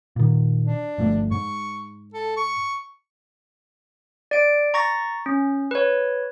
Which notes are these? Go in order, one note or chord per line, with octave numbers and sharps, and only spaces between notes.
A#2 D#3
D4
G1 F3 A3
G#2 C#6
A4
C#6
D5 D7
A#5 C#6 A6 A#6
C#4
B4 C#5